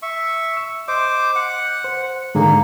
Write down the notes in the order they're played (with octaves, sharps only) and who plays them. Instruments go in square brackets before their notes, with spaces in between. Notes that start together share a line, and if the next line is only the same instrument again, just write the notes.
[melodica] E5 C#6
[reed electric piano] E6
[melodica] C5 D6 [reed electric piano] D#5
[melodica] F#5
[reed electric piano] C5
[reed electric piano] G#2 D3 G#4 [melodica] A#3